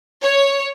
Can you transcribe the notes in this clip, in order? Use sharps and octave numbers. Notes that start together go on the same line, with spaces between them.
C#5